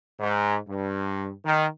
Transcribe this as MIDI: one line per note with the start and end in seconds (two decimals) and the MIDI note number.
0.19 0.56 44
0.67 1.30 43
1.45 1.66 51